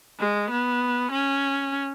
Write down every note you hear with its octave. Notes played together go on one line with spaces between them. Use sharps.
G#3
B3
C#4